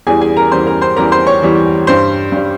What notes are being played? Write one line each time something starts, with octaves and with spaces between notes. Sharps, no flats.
E2 E3 G3 G#4 G#5
G#4 G#5
A#4 A#5
E2 E3 G3 C5 C6
A#4 A#5
C5 C6
E2 E3 G3 A#4 A#5
C5 C6
C#5 C#6
E2 E3 G3
G2 G3 C5 C6
G2 G3